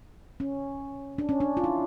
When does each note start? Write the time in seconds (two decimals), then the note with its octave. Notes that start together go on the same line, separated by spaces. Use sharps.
0.40 C#4
1.18 D4
1.29 C#4
1.40 D4
1.57 F4
1.64 E4